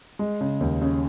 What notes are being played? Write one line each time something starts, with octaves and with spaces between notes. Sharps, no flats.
G#3
C#3
D#2
C#3